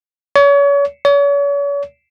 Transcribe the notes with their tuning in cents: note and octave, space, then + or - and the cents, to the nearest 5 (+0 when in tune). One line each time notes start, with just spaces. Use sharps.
C#5 +35
C#5 +40